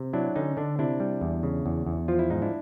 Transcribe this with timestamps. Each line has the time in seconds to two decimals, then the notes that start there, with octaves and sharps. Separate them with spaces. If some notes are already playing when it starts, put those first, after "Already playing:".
Already playing: C3
0.13 F#3 D4 E4
0.36 D3 C#4 D#4
0.57 D3 D4
0.79 C3 D4 E4
1.00 G3
1.21 E2
1.43 C#3
1.66 E2
1.86 E2
2.08 F3 F4
2.19 E4
2.30 G#2 D#4
2.42 D4 E4